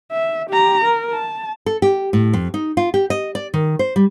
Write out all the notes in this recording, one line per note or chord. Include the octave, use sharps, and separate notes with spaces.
E5
G4 A#5
A#4
A5
A4
G4
A2
F2
D#4
F4
G4
D#5
D5
D#3
C5
G3